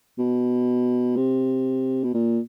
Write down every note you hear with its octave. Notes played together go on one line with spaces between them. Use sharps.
B2
C3
B2
A#2